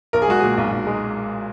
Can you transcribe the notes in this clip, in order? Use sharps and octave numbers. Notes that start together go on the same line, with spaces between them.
B1 A#4
G#4
G#3 F#4
A#2 G#4
B1
B1
G#3